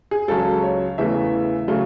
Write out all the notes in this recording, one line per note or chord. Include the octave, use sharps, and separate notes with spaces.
G#4
C#2 C#3 F#3 A4
C#5
E2 C#3 E3 A3 E5
C#3 F#3 A3